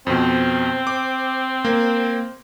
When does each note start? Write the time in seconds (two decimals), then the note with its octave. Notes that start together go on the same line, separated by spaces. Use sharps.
0.07 F2 B2 C4
0.87 D6
1.65 A#3